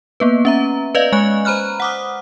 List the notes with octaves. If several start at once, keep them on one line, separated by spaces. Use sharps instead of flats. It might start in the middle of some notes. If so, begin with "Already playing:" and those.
A#3 B3 B4
C#4 E5 A#5
B4 D5 D#5 F5
G#3 G#5 C#6 F#6
C5 A#5 B5 F6 F#6
F#5 D6 D#6